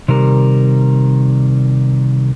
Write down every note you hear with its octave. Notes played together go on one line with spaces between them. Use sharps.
C3 D#3 G3 A#4